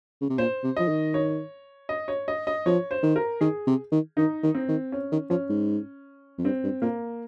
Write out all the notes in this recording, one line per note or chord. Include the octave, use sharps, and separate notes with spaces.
C#3
C3
A#2 C5
C3
F3 D#5
D#3
C#5
D#5
C#5
D#5
D#5
F3 C#5
C5
D#3
A#4
D#3 G#4
C3
D#3
D#3 D#4
D#3
C4
D#3
C#4
D#3
F3 C#4
G#2
F2
G2 C4
G2
A#2 A#3